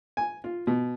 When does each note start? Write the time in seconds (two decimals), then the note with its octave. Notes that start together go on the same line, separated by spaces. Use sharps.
0.17 G#5
0.44 F4
0.67 B2